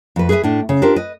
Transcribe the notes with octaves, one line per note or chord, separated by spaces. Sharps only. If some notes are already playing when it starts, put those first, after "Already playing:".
F2 B4
G#4 B4 C#5 E5 G#5
A2 D4
C#3
D4 F4 G4 A#4 C5
B4 D#5